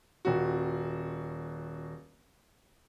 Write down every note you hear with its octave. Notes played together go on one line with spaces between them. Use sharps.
D#1 F#4